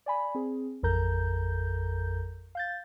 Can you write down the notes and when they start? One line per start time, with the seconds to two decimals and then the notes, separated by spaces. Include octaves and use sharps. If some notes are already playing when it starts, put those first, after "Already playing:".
0.06 D5 G#5 B5
0.35 C4 G#4
0.83 A1 F2 A4 A#4 A#5 G6
2.55 F5 G6 A6